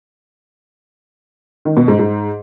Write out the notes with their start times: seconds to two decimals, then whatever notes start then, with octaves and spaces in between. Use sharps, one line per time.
1.65 D#3
1.77 B2
1.88 G#2
1.99 G#2